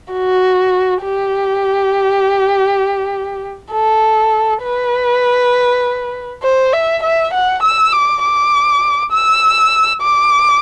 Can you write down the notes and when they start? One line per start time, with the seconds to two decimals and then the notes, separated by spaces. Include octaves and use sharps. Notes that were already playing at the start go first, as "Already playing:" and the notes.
0.13 F#4
1.03 G4
3.72 A4
4.63 B4
6.43 C5
6.73 E5
7.03 E5
7.33 F#5
7.63 E6
7.93 D6
8.23 D6
9.12 E6
10.02 D6